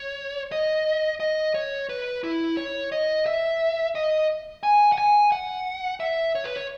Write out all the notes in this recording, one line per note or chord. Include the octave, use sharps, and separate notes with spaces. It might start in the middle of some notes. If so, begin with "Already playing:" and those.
Already playing: C#5
D#5
D#5
C#5
B4
E4
C#5
D#5
E5
D#5
G#5
F#5
G#5
F#5
E5
C#5
B4
C#5